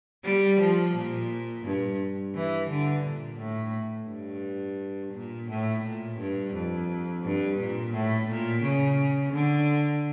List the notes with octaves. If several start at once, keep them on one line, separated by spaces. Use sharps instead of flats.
G3
F3
A#2
G2
E3
D3
A#2
A2
G2
A#2
A2
A#2
G2
F2
G2
A#2
A2
A#2
C#3
D3